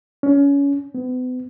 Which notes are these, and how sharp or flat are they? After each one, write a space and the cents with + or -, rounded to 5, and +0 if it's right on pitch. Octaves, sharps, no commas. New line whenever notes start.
C#4 +25
B3 +40